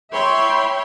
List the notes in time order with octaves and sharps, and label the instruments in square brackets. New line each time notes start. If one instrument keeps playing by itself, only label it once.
[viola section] C#5 E5 G5 B5 C6